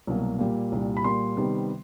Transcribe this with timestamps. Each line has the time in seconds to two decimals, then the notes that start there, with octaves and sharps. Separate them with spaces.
0.07 C2 B2 F#3 A#3
0.39 A#2 G3 A#3
0.72 C2 A#2 G3
0.97 B5
1.04 A#2 G3 A#3 C6
1.37 C3 D#3 G3 B3